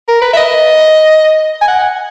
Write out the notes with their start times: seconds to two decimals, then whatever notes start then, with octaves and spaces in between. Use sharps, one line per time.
0.08 A#4
0.22 B4
0.33 E5
0.37 D#5
1.62 G#5
1.68 F#5